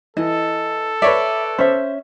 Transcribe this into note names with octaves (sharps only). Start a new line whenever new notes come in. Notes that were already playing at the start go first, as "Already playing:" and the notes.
E3 A4 D#5
B4 C#5 D5 E5
C#4 C5 E5